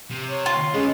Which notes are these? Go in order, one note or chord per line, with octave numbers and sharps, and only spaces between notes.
C3
C#5
F4
D#2 G#3 B3 C#4